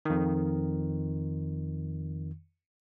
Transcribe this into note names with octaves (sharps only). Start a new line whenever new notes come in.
F2 D#3